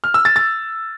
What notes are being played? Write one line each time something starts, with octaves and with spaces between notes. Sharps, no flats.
F6
E6
A6
A6